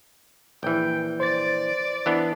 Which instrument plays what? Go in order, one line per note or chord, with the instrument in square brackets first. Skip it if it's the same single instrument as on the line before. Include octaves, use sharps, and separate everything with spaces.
[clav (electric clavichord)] A#1 E3 [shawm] G5
[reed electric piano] C5 A6 [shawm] D5
[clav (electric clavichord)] E3 B3 D4